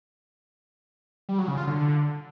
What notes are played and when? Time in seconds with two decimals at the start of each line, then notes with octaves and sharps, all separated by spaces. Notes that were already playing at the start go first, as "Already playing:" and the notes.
1.29 G3
1.38 F#3
1.48 C#3
1.58 F4
1.67 D3